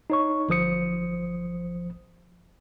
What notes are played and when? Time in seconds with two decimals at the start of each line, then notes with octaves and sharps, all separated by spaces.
0.10 D#4 C#5 C#6
0.49 G1 F3 C5 D#6 C#7